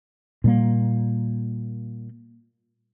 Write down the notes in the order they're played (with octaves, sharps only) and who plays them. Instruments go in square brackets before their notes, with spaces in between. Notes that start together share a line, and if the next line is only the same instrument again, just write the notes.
[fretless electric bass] A#2 G3 A#3